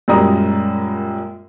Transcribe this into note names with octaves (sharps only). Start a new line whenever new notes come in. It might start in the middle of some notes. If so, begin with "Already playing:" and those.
F#2 A#2 G3 G#3 A#5 D#6